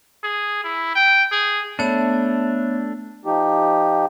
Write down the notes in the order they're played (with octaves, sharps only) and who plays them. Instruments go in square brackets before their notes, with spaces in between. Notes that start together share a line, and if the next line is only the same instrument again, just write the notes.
[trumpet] G#4
E4
G5
G#4
[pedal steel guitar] A3 D4 [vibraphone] B3 C#5
[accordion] F3 D#4 G4